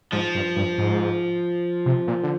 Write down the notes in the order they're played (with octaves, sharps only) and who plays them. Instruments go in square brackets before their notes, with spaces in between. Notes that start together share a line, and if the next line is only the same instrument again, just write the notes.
[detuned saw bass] G#2 [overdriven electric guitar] F3
[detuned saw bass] G2
G2
G#2
C3
A#2
D3